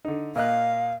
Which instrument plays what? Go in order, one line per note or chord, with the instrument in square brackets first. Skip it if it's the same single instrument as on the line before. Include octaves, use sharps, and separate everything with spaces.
[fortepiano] D3 D#4
[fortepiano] A#2 D#5 F#6 [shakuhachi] F5